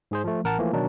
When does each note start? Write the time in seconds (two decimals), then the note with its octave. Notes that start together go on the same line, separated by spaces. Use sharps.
0.11 G#2 G#4 C5
0.24 F3 A3
0.44 A1 A#4 F#5 A5
0.59 E3 F3 A3 A#3
0.73 B2 D#3 F#3 D4 D#4